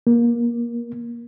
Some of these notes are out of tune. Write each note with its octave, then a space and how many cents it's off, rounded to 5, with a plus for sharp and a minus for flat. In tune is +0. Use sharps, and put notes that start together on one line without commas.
A#3 +25